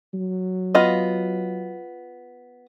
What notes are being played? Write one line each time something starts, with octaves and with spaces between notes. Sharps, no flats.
F#3
B3 F4 D#5